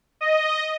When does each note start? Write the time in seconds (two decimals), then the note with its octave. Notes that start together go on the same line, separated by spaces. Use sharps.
0.21 D#5